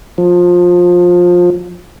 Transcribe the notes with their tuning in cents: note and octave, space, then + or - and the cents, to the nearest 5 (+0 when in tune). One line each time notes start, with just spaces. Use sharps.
F3 +20